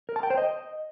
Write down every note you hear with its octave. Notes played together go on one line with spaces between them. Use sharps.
A#4
A5
G5
C5
D#5